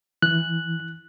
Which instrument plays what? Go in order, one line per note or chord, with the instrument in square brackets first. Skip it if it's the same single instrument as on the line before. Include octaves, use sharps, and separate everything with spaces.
[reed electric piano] E3 [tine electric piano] F#6